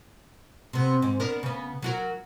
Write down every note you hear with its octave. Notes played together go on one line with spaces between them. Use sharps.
C3 B3
G#2
B3 D4 A#4
C#3 B3
F#3 F#4 A#4